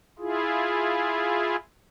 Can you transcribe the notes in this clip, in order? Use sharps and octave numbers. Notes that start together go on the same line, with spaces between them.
E4 F4 G#4